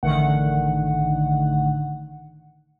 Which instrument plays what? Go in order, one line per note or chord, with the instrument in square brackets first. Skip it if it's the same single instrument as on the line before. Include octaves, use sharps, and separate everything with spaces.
[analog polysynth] A1 D3 D#3 A3 F#5